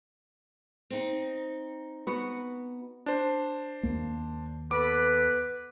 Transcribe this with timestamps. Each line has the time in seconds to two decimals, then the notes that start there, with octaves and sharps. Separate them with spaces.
0.90 C4 D#4
2.07 B3 F#4
3.06 D4 C5
3.83 D#2 A#3
4.71 B3 A4 B4 D6